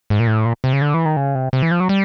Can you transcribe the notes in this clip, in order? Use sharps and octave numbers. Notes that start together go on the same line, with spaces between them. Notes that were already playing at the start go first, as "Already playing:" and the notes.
G#2
A#2
A2
A#2
C3
C#3
D3
E3
D#3
C#3
C3
C3
E3
F3
F#3
G3